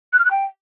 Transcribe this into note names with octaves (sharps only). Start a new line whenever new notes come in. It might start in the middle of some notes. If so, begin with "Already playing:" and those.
F#6
F6
F#6
G5